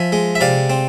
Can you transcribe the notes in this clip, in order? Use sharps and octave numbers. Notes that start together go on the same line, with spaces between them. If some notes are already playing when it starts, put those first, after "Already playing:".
Already playing: F3 E5 G#5
G#3
E5
C3 D5 F5
C4